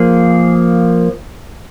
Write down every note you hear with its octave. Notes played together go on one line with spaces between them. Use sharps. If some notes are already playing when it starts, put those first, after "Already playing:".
Already playing: F3 A#3 G#4